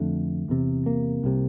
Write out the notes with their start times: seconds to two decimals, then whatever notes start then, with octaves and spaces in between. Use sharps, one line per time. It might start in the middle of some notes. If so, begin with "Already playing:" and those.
Already playing: F2 D3 A3
0.49 E2 C3
0.86 A#3
1.24 C2 C3